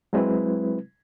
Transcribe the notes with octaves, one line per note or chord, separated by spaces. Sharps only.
F#3 G#3 C4 E4 B4